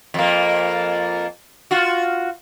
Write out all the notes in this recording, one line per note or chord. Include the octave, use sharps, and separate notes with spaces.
F2 A#3
F4 F#4